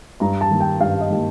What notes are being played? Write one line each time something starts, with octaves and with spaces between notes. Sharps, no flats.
G2 A#5
A5
D#3 G3 A#3
G5
G2 F5
D#5
D#3 G3 A#3